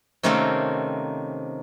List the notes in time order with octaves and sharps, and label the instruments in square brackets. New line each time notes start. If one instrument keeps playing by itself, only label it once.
[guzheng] C3 D#3 A3 A#3 C4 C#4